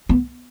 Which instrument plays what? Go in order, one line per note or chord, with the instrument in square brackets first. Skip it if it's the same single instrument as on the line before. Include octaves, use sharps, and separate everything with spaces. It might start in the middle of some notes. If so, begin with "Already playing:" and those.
[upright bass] B3